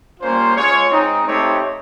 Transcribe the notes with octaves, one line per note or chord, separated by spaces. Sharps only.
G3 A#3 C#4 F4 C5
G#3 C#4 F4 C#5
G#3 C4 D#4
A3 C4 D#4 G4 C#5